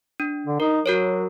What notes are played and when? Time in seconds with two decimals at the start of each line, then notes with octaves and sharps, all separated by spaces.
0.20 D4
0.47 D3
0.60 D#4 A#4
0.86 F#3 F#4 A#4 C#5